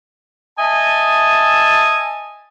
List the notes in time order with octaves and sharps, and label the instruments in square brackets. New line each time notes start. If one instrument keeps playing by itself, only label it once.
[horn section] D#5 E5 G#5 A5